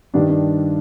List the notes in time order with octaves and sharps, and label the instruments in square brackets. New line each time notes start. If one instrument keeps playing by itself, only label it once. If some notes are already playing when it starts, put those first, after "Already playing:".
[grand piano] G2 D#3 G3 D4
D4